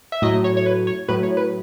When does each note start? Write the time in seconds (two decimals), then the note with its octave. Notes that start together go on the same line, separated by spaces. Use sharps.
0.12 E5
0.22 A2 F#3 D#5
0.44 C#5
0.57 C#5
0.66 B4
0.87 C#5
1.08 A2 F#3 B4
1.23 C#5
1.37 B4